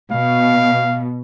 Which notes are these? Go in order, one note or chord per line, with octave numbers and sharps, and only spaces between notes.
B2 F5